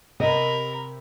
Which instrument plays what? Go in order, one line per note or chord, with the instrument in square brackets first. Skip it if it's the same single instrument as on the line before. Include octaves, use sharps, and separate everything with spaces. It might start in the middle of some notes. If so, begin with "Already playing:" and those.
[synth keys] C3 [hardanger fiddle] A#4 B5 [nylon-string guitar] D#5